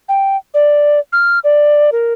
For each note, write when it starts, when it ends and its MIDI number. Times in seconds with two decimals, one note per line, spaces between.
0.09 0.37 79
0.54 0.99 74
1.13 1.39 89
1.44 1.90 74
1.92 2.13 70